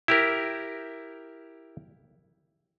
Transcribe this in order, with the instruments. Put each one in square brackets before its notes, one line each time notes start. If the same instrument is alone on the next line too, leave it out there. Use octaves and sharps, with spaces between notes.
[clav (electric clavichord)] E4 G4 A#4